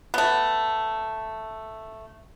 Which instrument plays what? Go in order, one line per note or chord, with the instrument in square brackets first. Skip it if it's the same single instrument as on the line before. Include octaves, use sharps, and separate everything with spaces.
[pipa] A3 B3